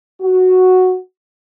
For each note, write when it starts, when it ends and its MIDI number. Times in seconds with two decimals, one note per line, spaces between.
0.21 0.98 66